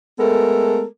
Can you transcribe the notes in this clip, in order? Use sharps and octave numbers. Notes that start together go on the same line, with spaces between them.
G#3 A3 B3 A4 A#4